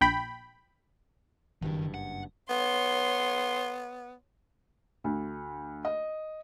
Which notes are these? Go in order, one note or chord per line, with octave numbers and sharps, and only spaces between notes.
A#1 G5 B5
F#1 G2 D#3
F#5
B3 C#5 C6
D2
D#5